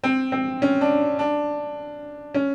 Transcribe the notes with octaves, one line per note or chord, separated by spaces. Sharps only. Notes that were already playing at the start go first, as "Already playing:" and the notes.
C4
C4
C#4
D4
D4
C#4